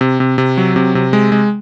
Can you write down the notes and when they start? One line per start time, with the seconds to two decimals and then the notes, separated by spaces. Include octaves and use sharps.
0.01 C3
0.20 C3
0.38 C3
0.57 F#3
0.76 C3
0.95 C3
1.13 G#3
1.32 G#3